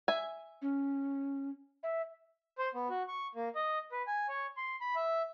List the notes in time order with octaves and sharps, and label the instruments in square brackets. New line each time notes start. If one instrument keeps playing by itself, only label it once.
[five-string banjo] E5 G#5
[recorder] C#4
E5
[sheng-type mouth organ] C5
B3
F#4
C#6
A#3
D#5
B4
G#5
C#5
C6
B5
E5